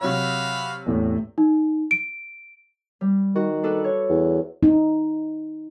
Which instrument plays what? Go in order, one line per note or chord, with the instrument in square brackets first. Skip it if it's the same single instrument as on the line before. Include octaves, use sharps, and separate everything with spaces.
[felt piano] C3 F#3 C#5 [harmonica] F#4 F5 B5
[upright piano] E2 A2
[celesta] D#4
D7
[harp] G3
[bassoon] D#3 [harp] F#4
[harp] D4 A4 B4
C#5
[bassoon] E2
[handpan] D#4